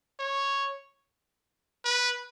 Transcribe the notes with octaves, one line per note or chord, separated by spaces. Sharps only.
C#5
B4